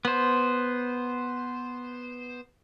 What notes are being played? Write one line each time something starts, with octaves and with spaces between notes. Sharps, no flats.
B3 C5